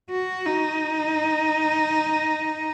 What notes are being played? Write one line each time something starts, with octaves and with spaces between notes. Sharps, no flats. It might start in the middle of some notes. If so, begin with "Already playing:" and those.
F#4
D#4